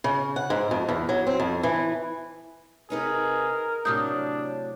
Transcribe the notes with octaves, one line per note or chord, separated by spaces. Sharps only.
C#3
F#5
G#2
F2
E2
F#3
C4
F2
E3
C3 D#4 G#4 A#4 B4
A2 C3 F#3 D4 D#6 G6